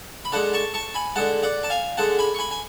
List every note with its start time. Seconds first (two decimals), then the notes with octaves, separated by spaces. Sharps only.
0.25 B5
0.32 D3 G#3 F#5 A5
0.53 A5 C#6
0.74 A5 C#6
0.94 G#5 B5
1.16 D3 G#3 F#5 A5
1.43 D5 F#5
1.63 A5
1.70 F5 G#5
1.97 D3 G#3 F#5 A5
2.19 G#5 B5
2.35 C#6
2.39 G#5 B5
2.51 G#5